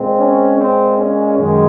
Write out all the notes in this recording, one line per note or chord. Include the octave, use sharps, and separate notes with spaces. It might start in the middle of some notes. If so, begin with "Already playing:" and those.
Already playing: A#2 G#3 C4
C#4
C4
C#4
F#2 D#3 G#3